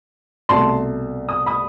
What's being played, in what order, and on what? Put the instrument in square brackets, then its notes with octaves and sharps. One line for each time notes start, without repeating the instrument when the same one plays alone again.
[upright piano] C2 B2 A3 A5 C6
D#6
B5 D#6